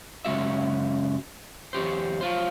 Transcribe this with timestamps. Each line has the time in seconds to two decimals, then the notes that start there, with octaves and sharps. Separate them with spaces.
0.25 F#2 C#3 G#3 F#4 E5
1.73 E2 F#3 G4 C5
2.21 F#3 F4 C5